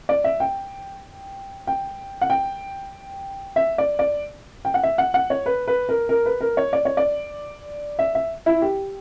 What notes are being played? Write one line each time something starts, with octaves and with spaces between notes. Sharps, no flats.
D5
E5
G5
G5
F#5
G5
E5
D5
D5
G5
F#5
E5
F#5
F#5
C#5
B4
B4
A#4
A#4
B4
A#4
C#5
D5
C#5
D5
E5
E5
E4
G4